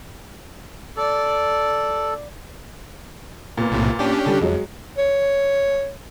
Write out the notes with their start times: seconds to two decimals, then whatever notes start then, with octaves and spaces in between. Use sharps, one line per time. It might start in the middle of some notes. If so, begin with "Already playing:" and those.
0.97 A4 D5
3.58 A#2 B3
3.71 B1 A2 C3
3.99 C#4 D4 G4
4.26 D3 G3
4.41 F2 F#3 G#3
4.98 C#5